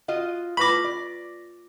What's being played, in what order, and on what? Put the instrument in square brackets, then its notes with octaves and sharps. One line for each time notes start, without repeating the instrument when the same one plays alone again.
[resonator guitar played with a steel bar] F4 F#4 D#5
[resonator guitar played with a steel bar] A2 [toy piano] F4 B4 C#6 [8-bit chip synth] B5 D6 [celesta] A#6 B6
[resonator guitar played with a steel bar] D5